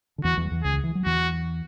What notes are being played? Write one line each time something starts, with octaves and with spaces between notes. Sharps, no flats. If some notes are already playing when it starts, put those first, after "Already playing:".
D3
E2 E3 F#4
E2 E3
F#3
E2 E3
C#2 C#3 G#4
E3
F#3
E2 E3 F#4